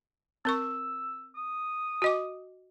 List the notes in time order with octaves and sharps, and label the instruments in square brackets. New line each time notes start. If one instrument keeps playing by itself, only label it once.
[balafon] C4 A#4 C#6 [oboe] E6
[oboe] D#6
[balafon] F#4 D#5 D6